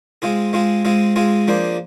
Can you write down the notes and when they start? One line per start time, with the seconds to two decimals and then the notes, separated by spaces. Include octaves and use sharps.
0.22 G#3 C4 F4 G#4
0.53 G#3 C4 F4 G#4
0.85 G#3 C4 F4 G#4
1.16 G#3 C4 F4 G#4
1.48 F3 A#3 D4 G#4 C5